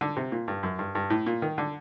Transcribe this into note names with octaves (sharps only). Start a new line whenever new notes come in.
D3
C3
A#2
G2
F#2
G2
G2
A2
A#2
D#3
D3